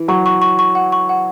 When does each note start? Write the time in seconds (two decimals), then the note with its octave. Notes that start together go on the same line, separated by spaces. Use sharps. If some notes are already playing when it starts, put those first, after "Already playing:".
Already playing: E3
0.08 F#3 C#6
0.26 C#6
0.42 C#6
0.59 C#6
0.75 F#5
0.92 C#6
1.09 F#5